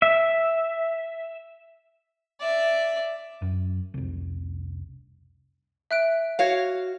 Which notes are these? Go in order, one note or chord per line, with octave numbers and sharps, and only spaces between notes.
E5
D5 E5
F#2
F1 C2
E5 F#6 D7
F#4 C#5 F5